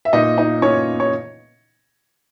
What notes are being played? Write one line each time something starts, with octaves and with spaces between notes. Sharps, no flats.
E5
A#2 D#4 D#5
D#4 D#5
A#2 C#4 C#5
C#5